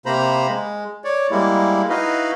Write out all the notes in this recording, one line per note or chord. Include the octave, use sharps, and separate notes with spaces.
C3 A#3 C5 A#5 B5
G#3
C#5 D5
G3 G#3 A#3 E4
D#4 E4 F#4 B4 D#5 F5